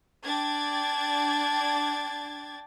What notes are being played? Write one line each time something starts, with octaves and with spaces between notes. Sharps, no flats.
D4 G5 G#6 A6